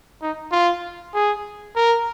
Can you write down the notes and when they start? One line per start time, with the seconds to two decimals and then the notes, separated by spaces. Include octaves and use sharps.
0.22 D#4
0.52 F4
1.14 G#4
1.76 A#4